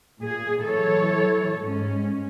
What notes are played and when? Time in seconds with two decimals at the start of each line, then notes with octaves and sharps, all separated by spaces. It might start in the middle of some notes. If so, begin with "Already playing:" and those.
0.21 A#2 G#4
0.66 E3 F#3 A4 C#5
1.61 G#2 G#3 C#4